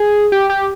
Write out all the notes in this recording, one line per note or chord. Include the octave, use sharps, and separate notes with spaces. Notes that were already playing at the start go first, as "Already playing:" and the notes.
Already playing: G#4
G4
G4